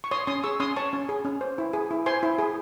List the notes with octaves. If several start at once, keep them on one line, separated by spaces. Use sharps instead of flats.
C#6
C#5 C6 D#6
C#4 C6 D#6
G#4 C#6 E6
C#4 C6 D#6
C#5 A5 C#6
C#4
G#4
C#4
C5
E4
G#4
E4
C5 G#5 C6
E4
G#4